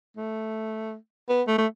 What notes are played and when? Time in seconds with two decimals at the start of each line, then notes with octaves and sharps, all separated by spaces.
0.17 A3
1.29 B3
1.48 A3
1.58 A3